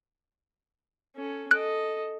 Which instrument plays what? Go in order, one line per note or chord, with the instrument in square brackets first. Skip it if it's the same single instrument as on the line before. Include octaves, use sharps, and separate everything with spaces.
[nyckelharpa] C#4 A4
[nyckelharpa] A4 D#5 [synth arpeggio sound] F#6 D7